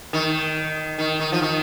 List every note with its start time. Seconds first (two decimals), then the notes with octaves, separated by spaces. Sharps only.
0.13 D#3
0.98 D#3
1.20 D#3
1.32 F3
1.42 D#3